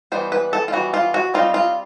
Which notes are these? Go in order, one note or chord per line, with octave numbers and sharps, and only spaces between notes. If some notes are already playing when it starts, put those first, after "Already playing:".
E3 G3 B3 C5
B4
A4
F4
E3 G3 B3 F#4
F4
F#4
G3 C4 D#4 F4
F4